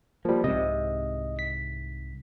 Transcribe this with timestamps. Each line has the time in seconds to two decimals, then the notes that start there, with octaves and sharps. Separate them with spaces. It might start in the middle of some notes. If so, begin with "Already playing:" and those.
0.25 F3 G3 A#3
0.44 C2 G#2 C3 D#5
1.39 B6